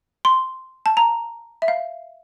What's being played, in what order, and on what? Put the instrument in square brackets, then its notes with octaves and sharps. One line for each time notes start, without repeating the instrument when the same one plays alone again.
[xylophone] C6
A5
A#5
E5
F5